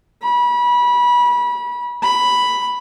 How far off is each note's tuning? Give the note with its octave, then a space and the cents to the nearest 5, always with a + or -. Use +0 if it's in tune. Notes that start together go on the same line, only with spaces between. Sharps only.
B5 -30
B5 +0